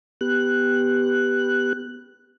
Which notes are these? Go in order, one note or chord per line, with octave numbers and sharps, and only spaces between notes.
B3 G4 F#6